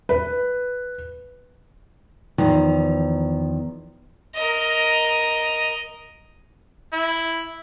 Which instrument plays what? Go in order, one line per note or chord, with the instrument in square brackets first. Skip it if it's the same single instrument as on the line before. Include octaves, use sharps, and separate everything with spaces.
[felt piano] B4
[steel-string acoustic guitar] E2 D#3 F3 A#5
[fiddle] A#4 D#5
[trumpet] E4